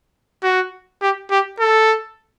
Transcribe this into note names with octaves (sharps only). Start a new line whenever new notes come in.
F#4
G4
G4
A4